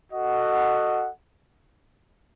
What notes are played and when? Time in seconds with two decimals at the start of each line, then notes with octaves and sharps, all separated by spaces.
0.13 F#4 A4 D#5 F#5